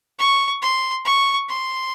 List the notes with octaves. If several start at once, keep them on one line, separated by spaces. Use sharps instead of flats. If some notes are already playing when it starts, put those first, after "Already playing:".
C#6
C6
C#6
C6